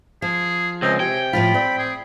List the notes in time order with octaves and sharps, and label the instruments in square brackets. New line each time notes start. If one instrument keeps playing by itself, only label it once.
[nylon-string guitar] F3 [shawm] G#4
[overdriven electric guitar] C#2 [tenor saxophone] C4 [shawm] D#5
[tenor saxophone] C3 [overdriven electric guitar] G5 [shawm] G#5
[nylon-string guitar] A2 F3 F4 [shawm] B5
[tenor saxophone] C4 [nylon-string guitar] D5
[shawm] G#4